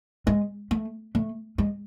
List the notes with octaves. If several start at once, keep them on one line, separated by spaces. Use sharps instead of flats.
G#3
A3
A3
G#3